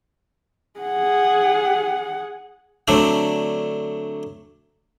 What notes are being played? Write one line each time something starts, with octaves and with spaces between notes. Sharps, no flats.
G#4 F#5
D3 F#3 A3 C4 D4